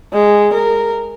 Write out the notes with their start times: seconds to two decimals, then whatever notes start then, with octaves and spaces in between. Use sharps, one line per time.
0.13 G#3
0.54 A#4